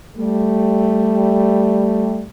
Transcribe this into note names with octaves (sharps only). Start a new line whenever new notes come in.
G3 A3